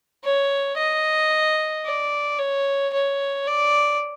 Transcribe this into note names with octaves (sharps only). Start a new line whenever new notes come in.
C#5
D#5
D5
C#5
C#5
D5